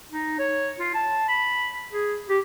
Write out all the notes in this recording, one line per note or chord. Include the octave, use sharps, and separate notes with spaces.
D#4
C#5
F4
A5
B5
G#4
G4